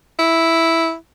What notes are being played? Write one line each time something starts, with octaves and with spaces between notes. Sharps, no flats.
E4